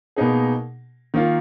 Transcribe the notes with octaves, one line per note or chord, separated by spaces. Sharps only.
B2 A#3 D#4 G#4
D#3 A#3 F4